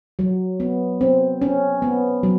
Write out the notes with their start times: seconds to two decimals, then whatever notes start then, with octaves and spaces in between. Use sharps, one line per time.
0.19 F#3
0.60 B3
1.01 C4
1.42 C#4
1.82 B3
2.23 F#3